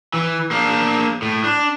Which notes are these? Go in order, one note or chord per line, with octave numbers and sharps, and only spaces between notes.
E3
A#3 D4
A2
D4